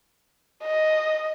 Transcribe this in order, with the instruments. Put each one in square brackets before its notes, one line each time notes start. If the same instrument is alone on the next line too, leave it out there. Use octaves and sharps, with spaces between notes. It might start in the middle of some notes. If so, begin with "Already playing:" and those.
[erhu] D#5